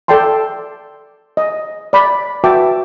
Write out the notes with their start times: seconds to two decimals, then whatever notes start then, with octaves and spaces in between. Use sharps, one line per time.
0.08 A4 D5 G5 A5 C6
1.37 D#5
1.93 D5 B5
2.44 F#4 B4 E5 G5 A5 D6